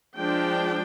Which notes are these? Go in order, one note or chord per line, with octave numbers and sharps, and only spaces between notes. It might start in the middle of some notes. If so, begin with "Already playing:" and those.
F3 G#3 D4 G5